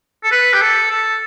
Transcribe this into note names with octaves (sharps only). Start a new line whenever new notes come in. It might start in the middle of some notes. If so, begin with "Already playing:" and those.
A4
B4
G4
A4
A4